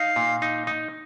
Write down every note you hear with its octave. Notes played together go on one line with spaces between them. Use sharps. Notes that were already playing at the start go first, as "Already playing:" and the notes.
Already playing: D#4 F5
A#2
D#4
D#4